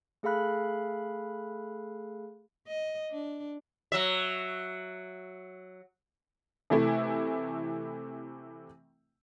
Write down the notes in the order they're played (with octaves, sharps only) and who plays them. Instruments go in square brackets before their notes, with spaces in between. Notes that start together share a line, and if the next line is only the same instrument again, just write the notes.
[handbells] A3 G#4 A4 F5 B5 F#6
[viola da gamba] D#5
D4
[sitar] F#3 E5
[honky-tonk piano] C3 E3 A3 E4